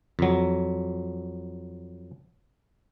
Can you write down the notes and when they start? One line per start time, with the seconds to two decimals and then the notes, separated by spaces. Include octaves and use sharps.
0.19 F2 F#3